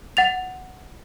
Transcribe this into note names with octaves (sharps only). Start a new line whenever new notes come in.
F#5 A6 F7